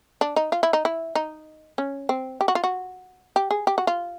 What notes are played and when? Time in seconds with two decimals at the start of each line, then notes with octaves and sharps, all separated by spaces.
0.21 D4
0.36 D#4
0.52 F4
0.63 E4
0.73 D#4
0.85 E4
1.15 D#4
1.78 C#4
2.09 C4
2.41 G4
2.48 F#4
2.55 F4
2.64 F#4
3.36 G4
3.51 G#4
3.67 G4
3.78 F#4
3.87 F4